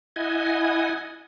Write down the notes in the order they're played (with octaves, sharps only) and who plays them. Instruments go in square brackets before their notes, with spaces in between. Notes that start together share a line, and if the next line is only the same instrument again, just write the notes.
[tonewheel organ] E4 D#5 F#5 G#5